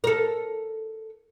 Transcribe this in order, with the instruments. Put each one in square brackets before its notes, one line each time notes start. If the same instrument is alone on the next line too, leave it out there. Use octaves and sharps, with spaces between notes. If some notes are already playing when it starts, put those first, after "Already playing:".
[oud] A4 A#4